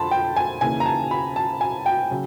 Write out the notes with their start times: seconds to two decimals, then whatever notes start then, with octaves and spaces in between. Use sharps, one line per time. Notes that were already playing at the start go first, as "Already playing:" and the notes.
Already playing: F2 D3 A5 B5 C6
0.11 G5
0.36 G#5
0.61 D#2 C#3 E3 G#5
0.80 A#5
0.86 A5
1.11 B5
1.36 A5
1.61 G#5
1.86 G5
2.11 C#3 F#3